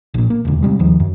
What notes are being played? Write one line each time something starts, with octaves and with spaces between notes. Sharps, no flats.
A#1 A#2
A#3
E1 D2
C3 G3 G#3
D#2 D#3 F3
F#2